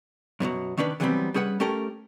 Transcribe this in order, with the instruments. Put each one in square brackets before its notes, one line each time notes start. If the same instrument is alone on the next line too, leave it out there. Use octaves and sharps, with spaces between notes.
[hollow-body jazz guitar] F#2 B2 D3 F#3
D#3 C#4 D4 B4
D3 E3 F#3 G3 B3 C4
G3 C#4 G#4 B4 F#5
A3 C#4 G4 A4 A#4